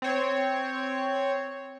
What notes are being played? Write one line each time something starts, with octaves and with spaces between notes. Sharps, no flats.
C4 C#5